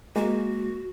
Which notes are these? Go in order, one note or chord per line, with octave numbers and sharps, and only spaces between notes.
G#3 A#3 F#4